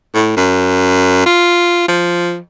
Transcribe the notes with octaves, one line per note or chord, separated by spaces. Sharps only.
A2
F#2
F4
F3